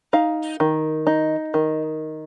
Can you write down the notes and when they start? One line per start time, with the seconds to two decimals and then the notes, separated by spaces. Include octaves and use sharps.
0.13 D#4 F5
0.60 D#3
1.07 D#4
1.54 D#3